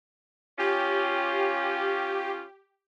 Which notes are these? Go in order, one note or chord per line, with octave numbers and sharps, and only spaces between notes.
C#4 F4 G4